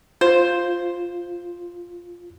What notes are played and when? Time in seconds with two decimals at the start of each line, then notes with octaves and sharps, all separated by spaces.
0.21 F4 C5